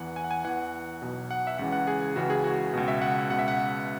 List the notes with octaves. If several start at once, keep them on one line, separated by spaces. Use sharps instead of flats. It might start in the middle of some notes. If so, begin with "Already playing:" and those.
Already playing: E2 E3 F#5
G#5
F#5
G#5
E2 E3 F#5
B1 B2
F#5
E5
C#2 C#3 E3 F#5
F#5
G#4
C#2 C#3 E3 F#4
G#4
F#4
C#2 B2 F#4
E5
F#5
C#2 B2 F#5
E5
F#5